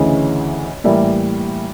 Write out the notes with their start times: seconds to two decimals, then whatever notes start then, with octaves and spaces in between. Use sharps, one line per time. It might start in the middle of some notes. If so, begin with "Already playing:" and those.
Already playing: D2 C#3 E3 C#5 D#5
0.84 A2 E3 G3 A#3 D5 E5